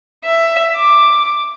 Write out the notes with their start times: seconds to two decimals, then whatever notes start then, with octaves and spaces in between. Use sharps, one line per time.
0.25 E5
0.77 D6